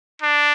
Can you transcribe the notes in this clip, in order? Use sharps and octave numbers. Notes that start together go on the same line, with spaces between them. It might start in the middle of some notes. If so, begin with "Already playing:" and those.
D4